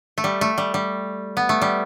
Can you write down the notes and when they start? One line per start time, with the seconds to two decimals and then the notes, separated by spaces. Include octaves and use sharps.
0.18 A3
0.24 G3
0.41 A3
0.58 G3
0.74 G3
1.37 B3
1.49 A3
1.62 G3